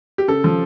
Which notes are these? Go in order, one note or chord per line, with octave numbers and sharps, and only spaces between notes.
G4
C#3 A4
F3